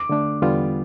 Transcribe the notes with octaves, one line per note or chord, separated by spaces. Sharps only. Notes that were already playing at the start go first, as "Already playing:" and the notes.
Already playing: D6
D3 A3 D4
E2 D3 G3 B3 F4